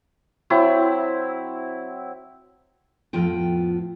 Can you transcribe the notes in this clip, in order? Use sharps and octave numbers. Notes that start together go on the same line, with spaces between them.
F#3 C4 E4
F2 A2 F3 B3 F4 G5